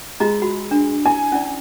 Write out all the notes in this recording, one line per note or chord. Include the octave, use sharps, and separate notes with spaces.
G#3 F4 D#5 A#5
F#4 B5
D4
E4 G#5
C#4 E4 D5